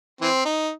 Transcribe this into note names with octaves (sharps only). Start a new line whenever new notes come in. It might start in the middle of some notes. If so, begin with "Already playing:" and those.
E3 C4
D#4